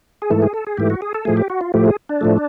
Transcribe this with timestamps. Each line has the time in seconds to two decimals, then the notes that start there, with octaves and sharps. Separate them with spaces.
0.22 G#4
0.30 G#2 E3 A3 A4
0.42 G#4
0.54 A4
0.67 G#4
0.77 G#2 E3 A3 G4
0.90 F#4
1.02 G#4
1.14 A4
1.25 A2 F3 A3 G#4
1.37 G4
1.50 F#4
1.61 F4
1.74 A2 F3 A3 G4
1.86 G#4
2.09 D4
2.21 A2 F3 A3